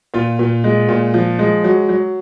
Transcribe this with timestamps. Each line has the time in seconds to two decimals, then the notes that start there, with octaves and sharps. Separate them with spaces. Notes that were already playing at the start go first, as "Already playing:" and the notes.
0.14 A#2 F4
0.39 A#2
0.64 G#3
0.89 A#2
1.14 F3
1.39 G#3
1.64 F#3
1.89 F#3